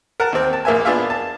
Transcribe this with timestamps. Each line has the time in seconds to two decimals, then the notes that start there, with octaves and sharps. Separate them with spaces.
0.20 A#4 F#5 A5
0.33 D#2 C4
0.53 A5
0.65 A#1 A#3 E5 G#5
0.85 B3 D4 F4 G#4 E5 F5
1.10 A5